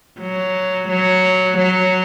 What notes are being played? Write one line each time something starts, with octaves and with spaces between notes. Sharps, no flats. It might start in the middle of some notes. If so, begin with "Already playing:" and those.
F#3
F#3
F#3